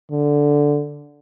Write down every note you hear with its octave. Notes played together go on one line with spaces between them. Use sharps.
D3